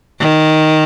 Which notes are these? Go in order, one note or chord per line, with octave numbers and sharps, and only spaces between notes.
D#3